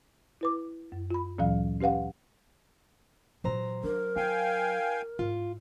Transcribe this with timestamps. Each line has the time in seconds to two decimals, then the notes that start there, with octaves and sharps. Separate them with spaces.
0.41 E4 B4 D6
0.92 F#2
1.11 F4 B5
1.38 D2 A#2 E3 F#3 F5
1.81 C#4 G4 B4 F5 F#5
3.44 A#2 E3 F#3 C5 A#5
3.84 D4 A#4
4.16 E4 F5 G5 G#5
5.19 G#2 F4